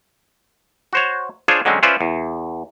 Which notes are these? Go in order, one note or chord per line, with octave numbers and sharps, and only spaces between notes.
F#4 C5 C#5
D4 F4 G#4 C5 C#5 G#5
D3 F#3 G#3 C4 C#4
C#4 F4 B4 C5 D5 E5
E2